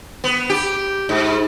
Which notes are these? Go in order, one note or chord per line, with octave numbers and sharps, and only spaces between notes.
B3
G4
G#2